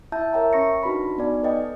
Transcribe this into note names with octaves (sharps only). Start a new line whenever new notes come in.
E4 E5 A5 G6
A#4 C#5 E5 G5 A#5
C#4 C#6 A#6 C#7
D4 D#4 F#4 B4 B5
B3 D#4 D5 G#5
A4 B4 D#5 G5